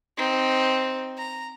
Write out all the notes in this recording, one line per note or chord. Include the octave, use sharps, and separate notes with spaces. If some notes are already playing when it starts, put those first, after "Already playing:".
C4 D#4
A#5